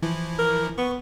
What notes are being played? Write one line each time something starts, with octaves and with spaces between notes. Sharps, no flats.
E3 F3 E4
A#4
B3 C#6